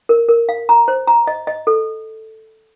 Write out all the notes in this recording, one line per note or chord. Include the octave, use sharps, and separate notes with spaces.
A#4
A#4
F5
A#5
C5
A#5
D#5
D#5
A4